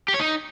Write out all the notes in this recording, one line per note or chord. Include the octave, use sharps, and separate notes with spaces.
G4
C#5
D#4